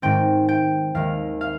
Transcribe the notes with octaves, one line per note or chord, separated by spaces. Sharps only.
G#2 D#3 G#3 C4 G5
G5
D#2 D#3 G#3 F5
F5